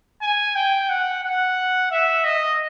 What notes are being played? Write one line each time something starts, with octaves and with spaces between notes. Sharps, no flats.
G#5
G5
F#5
F#5
E5
D#5